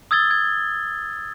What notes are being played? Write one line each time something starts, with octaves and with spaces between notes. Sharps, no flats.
D#6 E6 G#6 A6 G7
G#6